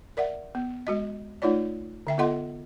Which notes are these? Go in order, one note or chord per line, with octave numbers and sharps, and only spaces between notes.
A#4 D5 E5 F#5
B3
G#3 F#4 D#5
A3 D#4 F4 C#5 D5
D3 E5 G5
B3 F4 A4 D#5 F#5 C6